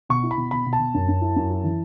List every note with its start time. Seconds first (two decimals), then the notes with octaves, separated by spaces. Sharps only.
0.09 B2 C#6
0.23 E4
0.31 B5
0.37 B2
0.51 B2 B5
0.66 B2
0.73 A5
0.79 B2
0.94 F#2
1.09 F#2
1.21 E4
1.36 F#2
1.50 E4
1.64 E3